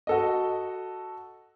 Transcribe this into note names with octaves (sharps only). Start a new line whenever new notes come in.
F#4 A4 D#5